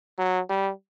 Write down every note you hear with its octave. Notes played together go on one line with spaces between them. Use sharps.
F#3
G3